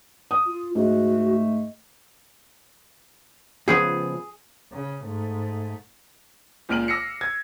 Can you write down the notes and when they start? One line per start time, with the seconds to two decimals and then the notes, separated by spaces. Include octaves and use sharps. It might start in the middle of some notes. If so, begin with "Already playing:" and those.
0.31 D#6
0.46 F4
0.75 G#2 A3 F#4
3.68 C#2 F3 B3 G#4
4.73 C#3
5.03 G#2 A3
6.69 C#2 A#2 F6 D7 F#7
6.88 D6 E6 A#6 C7 C#7
7.21 G#6